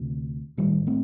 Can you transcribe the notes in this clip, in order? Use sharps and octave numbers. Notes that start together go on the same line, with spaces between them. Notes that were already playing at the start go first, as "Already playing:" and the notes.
Already playing: D2 C3
A1 A2 D#3 G3
A3 C4